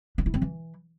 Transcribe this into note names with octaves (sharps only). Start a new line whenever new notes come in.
D4
E4
C4
E3